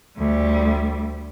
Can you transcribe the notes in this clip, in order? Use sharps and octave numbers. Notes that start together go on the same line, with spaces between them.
D2 G3